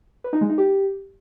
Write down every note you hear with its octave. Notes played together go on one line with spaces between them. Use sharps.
B4
D#4
G#3
D#4
G4